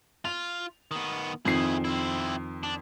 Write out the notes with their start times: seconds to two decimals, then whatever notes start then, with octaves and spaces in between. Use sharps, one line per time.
0.25 F4 F7
0.91 D#3 B3
1.45 F2 D#3 E4 G#4 C7
1.85 C4 E4
2.63 D4